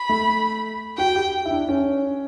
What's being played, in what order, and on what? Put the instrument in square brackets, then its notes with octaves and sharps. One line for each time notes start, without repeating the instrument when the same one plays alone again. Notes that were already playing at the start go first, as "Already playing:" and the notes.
Already playing: [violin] B5
[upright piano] A3
[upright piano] F#4 [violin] G5
[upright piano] G4
E4
D4
C#4